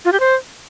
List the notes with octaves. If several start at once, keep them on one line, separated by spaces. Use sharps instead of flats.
F4
G4
C5